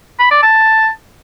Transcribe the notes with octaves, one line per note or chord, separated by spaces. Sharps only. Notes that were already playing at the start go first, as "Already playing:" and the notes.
B5
D5
A5